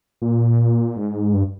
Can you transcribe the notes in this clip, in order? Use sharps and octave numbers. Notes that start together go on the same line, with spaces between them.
A#2
G#2
G2